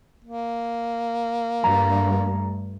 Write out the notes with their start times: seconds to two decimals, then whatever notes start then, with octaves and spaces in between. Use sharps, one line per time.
0.25 A#3
1.64 G2 A3 A#5